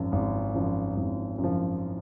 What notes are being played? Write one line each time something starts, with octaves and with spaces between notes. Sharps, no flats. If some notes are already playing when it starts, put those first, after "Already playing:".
Already playing: G#1 F#2 F3
G#1
F#2 F3
G#1
F#2
F3